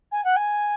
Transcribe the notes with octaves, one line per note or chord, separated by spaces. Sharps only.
G#5
F#5
G#5